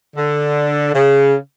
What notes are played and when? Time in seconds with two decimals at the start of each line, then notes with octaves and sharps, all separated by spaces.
0.15 D3
0.93 C#3